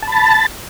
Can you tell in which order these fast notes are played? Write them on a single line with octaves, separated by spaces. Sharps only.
A5 B5 A6